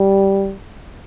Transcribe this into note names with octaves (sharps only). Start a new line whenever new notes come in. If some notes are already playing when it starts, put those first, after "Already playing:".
Already playing: G3